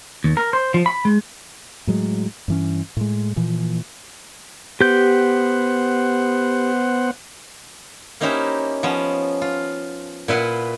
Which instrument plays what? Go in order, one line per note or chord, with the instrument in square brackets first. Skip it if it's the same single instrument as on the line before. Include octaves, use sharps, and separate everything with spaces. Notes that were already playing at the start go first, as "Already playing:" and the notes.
[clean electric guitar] D#2
A#4
C5
F3
B5
G#3
[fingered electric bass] A2 F#3 G#3
G2 E3 C#4
A2 G#3
A#2 E3 F3
[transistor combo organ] B3 C5 F#5 [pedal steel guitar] G4 G6
[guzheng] A#3 C#4 D#4 E4 G4 C5
F3 B3 C#4
F4
A#2 E4 B4 F#5 C6